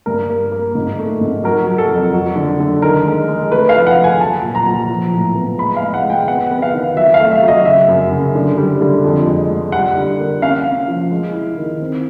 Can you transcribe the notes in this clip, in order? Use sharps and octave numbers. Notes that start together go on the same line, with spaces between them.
G2 A#4
A#3
A#3
G#2
A3
G#2
F#3 A#4
F#3
A4
F2
F#3
D3
D3
D#3 A#4
G#3
G#3
A3 B4
F5
F3
F#5
A3
G#5
F#3 A5
A#2
A#5
F#3
F3
A2
B3
G#3 B5
F5
G#3
F#5
G#3
G5
B3 F#5
B3
F5
D#3
F#3 E5
F5
A3
E5
F#3
D#5
C#3 E5
F#2
C#3
D3
G3
D3
F2
G#3
G#3
G3 F#5
D3
A#3
C#4 F5
C#4
F3
G#3
E4
D#3
C4